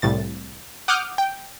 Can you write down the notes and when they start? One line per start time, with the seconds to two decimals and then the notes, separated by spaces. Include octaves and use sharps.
0.02 C2 A2 A6
0.88 F#5 D6 D#6 F6 G6
1.18 G5